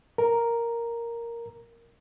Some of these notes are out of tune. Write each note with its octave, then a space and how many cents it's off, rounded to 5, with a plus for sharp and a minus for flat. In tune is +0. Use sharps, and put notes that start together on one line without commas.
A#4 +0